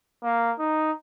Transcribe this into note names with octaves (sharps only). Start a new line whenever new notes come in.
A#3
D#4